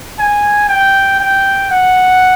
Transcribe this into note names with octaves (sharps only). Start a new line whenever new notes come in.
G#5
G5
G5
F#5